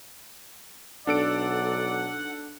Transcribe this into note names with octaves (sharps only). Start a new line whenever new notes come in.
B1 D4 A4 D5 F#5 D7